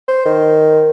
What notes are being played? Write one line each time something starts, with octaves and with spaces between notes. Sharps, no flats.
C5
D#3